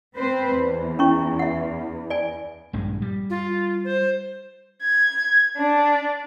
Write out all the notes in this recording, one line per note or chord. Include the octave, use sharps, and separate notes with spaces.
C4 B4 C5
E2
C#4 E4 C#6
E5 F#5
D5 G#5
A#1 G2 G#3
G3
F4
C5
G#6
D4